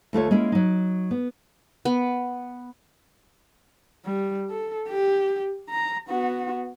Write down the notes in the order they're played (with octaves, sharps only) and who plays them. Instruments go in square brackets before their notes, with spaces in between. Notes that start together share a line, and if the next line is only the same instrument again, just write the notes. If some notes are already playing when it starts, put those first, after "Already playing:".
[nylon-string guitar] D2 A3 F4 C#5
G#3 A#3 C#4 E4 A#4
F#3 D#4
B3
[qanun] B3
[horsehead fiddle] G3
A4
G4
A#5
B3 F#4